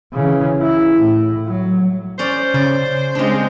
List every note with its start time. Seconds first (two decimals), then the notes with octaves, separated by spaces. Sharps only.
0.13 C#3 E3
0.62 E4
0.99 A2
1.46 F#3
2.19 C#4 C5 D5
2.54 C#3 D5
3.15 G#3 C4 D4 F4